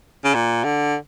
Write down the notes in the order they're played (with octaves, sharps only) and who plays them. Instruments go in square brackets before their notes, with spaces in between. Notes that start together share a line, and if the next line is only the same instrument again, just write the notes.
[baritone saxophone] C#3
A#2
D3